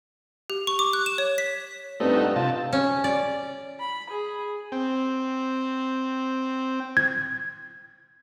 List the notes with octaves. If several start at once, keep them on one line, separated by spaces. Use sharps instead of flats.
G4
C#6
D6
F#6
E7
C#5
B6
G2 A3 C4 C#4 D#4 B4
D#5 F#5 F#6
C3 F4 A5
C#4
D5
B5
G#4
C4 G5
G#6